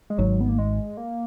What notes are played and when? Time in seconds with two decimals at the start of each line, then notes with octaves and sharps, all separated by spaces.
0.10 G#3
0.18 G#1 G#2 F#3
0.41 B3
0.49 A#3
0.58 G#3
0.97 A#3